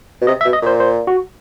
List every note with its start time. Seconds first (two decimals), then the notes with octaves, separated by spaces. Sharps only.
0.21 B2
0.27 C3 D#5
0.41 E5
0.45 B2
0.53 D#5
0.62 A#2 C5
0.80 C5
1.07 F#4